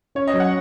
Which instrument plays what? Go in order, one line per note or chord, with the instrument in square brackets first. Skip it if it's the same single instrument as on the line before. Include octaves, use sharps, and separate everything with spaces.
[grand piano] C#4 [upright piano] C#5
[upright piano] D#5
[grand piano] F#3
[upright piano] F#5